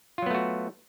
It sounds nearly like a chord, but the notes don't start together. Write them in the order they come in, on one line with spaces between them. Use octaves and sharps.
F4 F#3 B3 A3 F#4